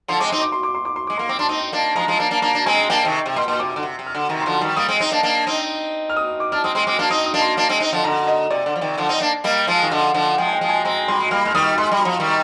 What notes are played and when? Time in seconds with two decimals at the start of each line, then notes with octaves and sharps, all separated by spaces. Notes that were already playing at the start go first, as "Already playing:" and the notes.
0.08 D3 F3 C6
0.20 G#3 C4 D6
0.30 C4 D#4 C6
0.42 D6
0.52 C6
0.63 D6
0.74 C6
0.85 D6
0.96 C6
1.07 G#3 D6
1.18 A#3 C6
1.29 C4 D6
1.39 D4 C6
1.49 C4 D#4
1.72 A#3 D4
1.95 F3 G#3 A#5
2.08 F3 G#3
2.20 A#3 D4
2.31 A#3 D4
2.42 A#3 D4 A#5
2.55 D4
2.66 G#3 C4 G#5
2.90 A#3 D4 G5
3.05 C3 D#3
3.26 C3
3.36 A#2 C6
3.48 A#2
3.59 C3 D6
3.76 D3
3.83 C3
3.99 C3
4.07 F6
4.15 D3
4.29 C3 D#3 A#5
4.42 C6
4.46 D3 F3
4.61 D#3 G3
4.76 G3 A#3 D#6
4.88 G#3 C4
5.00 C4 D#4
5.12 A#3 D4
5.23 A#3 D4
5.47 C4 D#4
6.10 F6
6.16 D#6
6.40 D6
6.52 D4 F6
6.64 G#3 C4 D#6
6.75 G#3 C4 C6
6.87 G#3 C4 D6
6.99 A#3 D4 F6
7.10 C4 D#4 D#6
7.26 D#6
7.34 A#3 D4
7.42 C6
7.57 A#3 D4
7.69 G#3 C4
7.80 C4 D#4
7.93 D3 F3
8.04 D3 A#5
8.27 D#5
8.50 C3 D5
8.66 D3
8.76 F3
8.81 C3 D#3
8.98 D3 F3
9.09 C4 D#4
9.20 A#3 D4
9.44 G3 A#3 D#5
9.67 F3 G#3 F5
9.82 D#3
9.90 D3 F3
10.14 D3 F3
10.38 F3 G#3 G5
10.48 G#5
10.53 G5
10.61 F3 G#3
10.69 G#5
10.84 G#3 C4 A#5
11.08 G3 C6
11.20 G#3
11.31 G3 A#3 F6
11.45 G#3 F6
11.55 D#3 G3 D#6
11.78 G#3 C6
11.91 G3
12.01 F3 A#5
12.20 D#3 G3